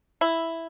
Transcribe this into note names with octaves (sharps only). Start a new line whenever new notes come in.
E4